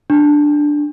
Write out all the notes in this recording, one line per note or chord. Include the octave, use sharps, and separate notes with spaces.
D4